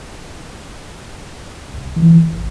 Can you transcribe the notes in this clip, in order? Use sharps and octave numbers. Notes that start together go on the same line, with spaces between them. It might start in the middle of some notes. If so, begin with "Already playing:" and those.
C2
E3
F1
A1